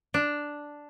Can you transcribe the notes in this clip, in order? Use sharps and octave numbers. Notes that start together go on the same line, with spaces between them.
D4